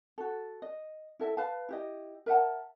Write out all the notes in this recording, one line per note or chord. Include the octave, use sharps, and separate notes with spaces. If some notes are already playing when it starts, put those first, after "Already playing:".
F#4 A4
D#5
E4 A4 E5
B4 F5 A5
E4 G4 D#5
A#4 E5 F#5 A5